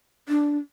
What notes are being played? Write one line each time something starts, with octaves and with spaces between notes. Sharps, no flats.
D4